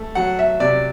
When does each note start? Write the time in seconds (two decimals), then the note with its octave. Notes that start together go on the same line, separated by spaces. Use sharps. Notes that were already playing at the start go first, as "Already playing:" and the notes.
Already playing: A3
0.15 F#3 F#5
0.39 E5
0.60 C3 D5